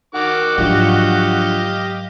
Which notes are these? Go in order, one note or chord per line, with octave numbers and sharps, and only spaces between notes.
D#3 F#4 F#5 D6
G#2 F3 F#3 D4 F4 G4 D#5 F5